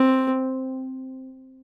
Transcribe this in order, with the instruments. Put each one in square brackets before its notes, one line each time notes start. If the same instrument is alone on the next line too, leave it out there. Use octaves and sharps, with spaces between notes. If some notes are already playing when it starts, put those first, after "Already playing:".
Already playing: [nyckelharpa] C4